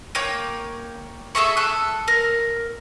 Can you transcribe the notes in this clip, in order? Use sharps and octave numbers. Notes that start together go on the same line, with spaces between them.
A#3 C#5 G5 G6
G#4 A4 E5 C#6
A4 F#6
A#4